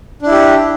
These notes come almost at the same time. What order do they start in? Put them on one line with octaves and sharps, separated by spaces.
D4 E4 G4